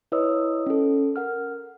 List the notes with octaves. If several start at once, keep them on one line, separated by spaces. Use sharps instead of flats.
E4 B4 C#5 D#5 D#6 E6
C#4 A4
A#4 F#5 F6